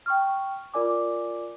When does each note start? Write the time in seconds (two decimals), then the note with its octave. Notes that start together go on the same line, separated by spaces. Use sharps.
0.06 G5 C#6 F6
0.74 F4 A#4 D5 G#5 D6